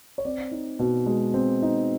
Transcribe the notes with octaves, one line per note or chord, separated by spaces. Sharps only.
C#5
C4 D5
D#4
B2
G#3
C4
D#4